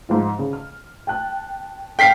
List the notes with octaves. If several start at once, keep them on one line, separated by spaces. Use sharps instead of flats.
G#2 F3 F4
C#3
F6
G5 A5 F#6
A4 F5 G5 F6 B6 C7